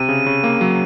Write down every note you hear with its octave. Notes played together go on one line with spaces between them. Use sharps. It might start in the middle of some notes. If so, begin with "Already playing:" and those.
Already playing: C3 D#7
C#3
C#3
A#3
F#3